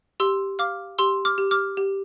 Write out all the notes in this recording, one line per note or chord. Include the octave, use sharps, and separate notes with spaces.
G4 C6 E6
F5 D6 F6
G4 C6 E6
D6 F6
G4
D6 F6
G4